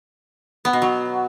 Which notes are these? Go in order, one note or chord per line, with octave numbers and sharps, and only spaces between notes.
B3
B2
F#3